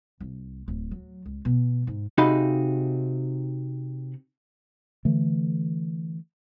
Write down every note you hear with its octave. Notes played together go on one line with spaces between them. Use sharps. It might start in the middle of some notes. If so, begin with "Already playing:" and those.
C2
D1
F#3
C#2
B2
G#2
C3 D#4 F#4 G#4 F5 B5
D3 E3 A3